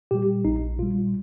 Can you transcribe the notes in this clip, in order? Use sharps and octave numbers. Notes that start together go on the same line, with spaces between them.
A#2 G3 G4
A#1 D#4
A#2 G3 F4